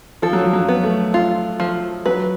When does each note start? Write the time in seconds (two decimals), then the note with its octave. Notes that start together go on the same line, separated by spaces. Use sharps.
0.22 F3 A4
0.33 F#3
0.43 F3
0.53 F#3
0.68 B3
0.84 A3
1.14 F4
1.60 F3
2.06 F#3 B4